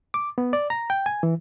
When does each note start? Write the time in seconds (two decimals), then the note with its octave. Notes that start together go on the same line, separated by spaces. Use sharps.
0.14 D6
0.38 B3
0.53 D5
0.70 A#5
0.90 G5
1.06 G#5
1.23 E3